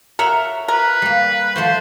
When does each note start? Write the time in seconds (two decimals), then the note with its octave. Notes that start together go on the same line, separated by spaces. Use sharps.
0.19 A#4 C#5 E5 F#5
0.68 A#4 B4
1.02 G3 A#3
1.56 F3 A3 F#4 C5